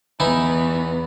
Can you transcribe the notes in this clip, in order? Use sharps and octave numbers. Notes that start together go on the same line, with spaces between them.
E2 E3 B3 D#4 E4